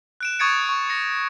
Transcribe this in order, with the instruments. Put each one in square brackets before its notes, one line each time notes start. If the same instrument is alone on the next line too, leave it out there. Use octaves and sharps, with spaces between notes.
[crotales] F#6 D7 E7
C#6 D#6 G#6 A6 C#7 D7
C#6
A#6 C#7